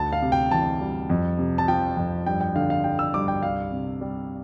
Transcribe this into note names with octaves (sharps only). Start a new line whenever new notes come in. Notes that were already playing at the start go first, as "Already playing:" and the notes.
Already playing: D2 A5
F5
C3
G5
E3 A5
G3
F2
C3
A5
F3 G5
F2
G2 G5
G5
D3 F5
F5
G3 G5
E6
G2 D6
G5
C2 F5
C3
G3